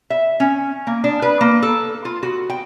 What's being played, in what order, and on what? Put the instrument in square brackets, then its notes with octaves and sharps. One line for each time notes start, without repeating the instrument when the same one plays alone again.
[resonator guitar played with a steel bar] E5
C#4
A#3
D4
B4
A#3
A4
F4
F#4
G5